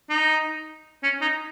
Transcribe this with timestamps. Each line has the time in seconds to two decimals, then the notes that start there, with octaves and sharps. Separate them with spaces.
0.10 D#4
1.03 C#4
1.21 D#4